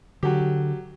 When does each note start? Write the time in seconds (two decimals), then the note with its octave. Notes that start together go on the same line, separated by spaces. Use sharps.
0.23 D3 F#3 G4